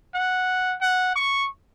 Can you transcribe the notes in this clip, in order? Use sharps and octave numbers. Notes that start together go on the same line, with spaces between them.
F#5
F#5
C#6